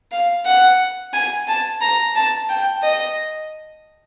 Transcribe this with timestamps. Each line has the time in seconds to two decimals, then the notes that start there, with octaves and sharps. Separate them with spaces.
0.12 F5
0.46 F#5
1.13 G#5
1.47 A5
1.81 A#5
2.15 A5
2.49 G5
2.83 D#5